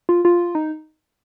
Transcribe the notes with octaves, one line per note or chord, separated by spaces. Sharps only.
F4
F4
D#4